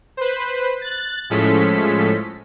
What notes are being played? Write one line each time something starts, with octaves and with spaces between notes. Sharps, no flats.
B4 C5
F#6 A6
A2 F3 G#3 C#4 A4 B6